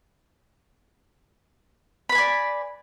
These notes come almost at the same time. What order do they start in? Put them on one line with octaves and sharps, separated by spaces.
B5 B4 G#5 D5